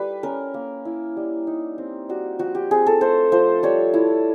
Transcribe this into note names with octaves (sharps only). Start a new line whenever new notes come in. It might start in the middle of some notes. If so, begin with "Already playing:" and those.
Already playing: G3 B4
C#4 A#4
A#3
E4
G3
D#4
C4
G3 F#4
F3 F#4
G4
C4 G#4
A4
A3 C5
F3 C5
G3 C#5
E4